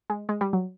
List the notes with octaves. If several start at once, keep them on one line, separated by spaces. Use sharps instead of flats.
G#3
G#3
G3
F#3